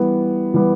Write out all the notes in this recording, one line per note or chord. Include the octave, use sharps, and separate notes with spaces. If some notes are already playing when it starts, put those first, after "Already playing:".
Already playing: E3 G3 B3
E3 G3 B3